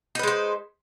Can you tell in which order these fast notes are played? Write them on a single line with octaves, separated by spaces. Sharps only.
D#4 B4 G#3 C5